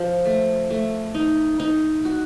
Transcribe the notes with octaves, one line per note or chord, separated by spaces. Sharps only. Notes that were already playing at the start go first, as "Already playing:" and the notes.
Already playing: F3
A3
A3
D#4
D#4
F#4